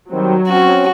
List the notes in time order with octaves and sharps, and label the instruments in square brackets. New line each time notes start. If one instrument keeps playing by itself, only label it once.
[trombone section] D#3 G3 C4 [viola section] F#3
[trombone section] C4 C#4 [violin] F#4